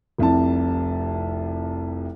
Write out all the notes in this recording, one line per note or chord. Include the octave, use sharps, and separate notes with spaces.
F1 C2 C3 A5